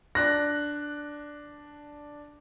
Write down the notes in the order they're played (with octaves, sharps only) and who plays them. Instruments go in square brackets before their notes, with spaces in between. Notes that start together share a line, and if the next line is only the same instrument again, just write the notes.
[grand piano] D4 F#6 A#6